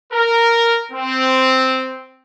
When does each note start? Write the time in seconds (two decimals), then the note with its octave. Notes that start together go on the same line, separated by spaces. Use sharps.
0.13 A#4
0.92 C4